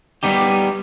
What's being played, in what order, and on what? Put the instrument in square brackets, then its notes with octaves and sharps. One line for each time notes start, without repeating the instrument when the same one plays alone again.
[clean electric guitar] G3 B3 D#4 G4